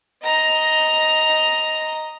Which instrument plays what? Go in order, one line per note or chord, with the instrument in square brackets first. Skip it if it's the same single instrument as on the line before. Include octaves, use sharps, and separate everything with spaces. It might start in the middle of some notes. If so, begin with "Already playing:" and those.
[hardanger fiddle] D#5 A#5